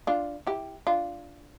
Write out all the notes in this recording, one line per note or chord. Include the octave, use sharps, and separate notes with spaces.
D4 F4
E4 G4
D4 F4